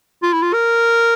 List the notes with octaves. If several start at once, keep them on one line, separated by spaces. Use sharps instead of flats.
F4
E4
F4
A#4